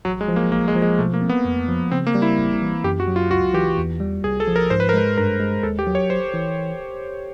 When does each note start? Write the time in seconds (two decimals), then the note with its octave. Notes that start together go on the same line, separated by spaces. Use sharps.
0.05 A1 F#3
0.21 G#3
0.28 F3
0.36 A#3
0.51 A#1 A#3
0.68 G#3
0.75 F3
0.82 G#3
0.98 B2 A3
1.14 A#3
1.21 C4
1.29 B3
1.45 F2
1.68 F3
1.91 C#3 C4
2.07 A#3
2.15 G3
2.22 E4
2.38 A1
2.61 E3
2.84 F#2 G4
3.00 F#4
3.08 F#3
3.16 F4
3.31 C#2 F#4
3.54 E3 G4
3.77 E2
4.00 G3
4.24 C2 G#4
4.40 A4
4.47 F3
4.56 A#4
4.70 G#2 C5
4.80 B4
4.89 A#4
4.94 G#3 B4
5.17 G2 A#4
5.40 G#3
5.63 D#2 A4
5.79 G4
5.87 F#3
5.95 C#5
6.10 G#1 C5
6.34 E3